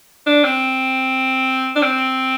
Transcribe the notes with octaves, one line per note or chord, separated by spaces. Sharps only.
D4
C4
D4
C4